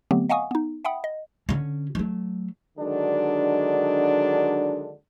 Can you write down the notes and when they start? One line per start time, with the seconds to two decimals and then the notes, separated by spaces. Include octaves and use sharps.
0.11 D3 F#3 A3 B3 C4 G4
0.29 D#5 F5 F#5 G#5 C#6 D#6
0.51 B3 D#4
0.85 E5 F#5 G5 B5 D#6
1.04 D#5
1.49 D3 C#4
1.95 F#3 A3
2.78 D3 D#3 F#3 G#3 D4